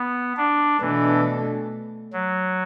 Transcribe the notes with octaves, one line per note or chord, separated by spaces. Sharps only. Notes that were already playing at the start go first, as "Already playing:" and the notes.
Already playing: B3
D4
B2 E3 A3 D4 A4
F#3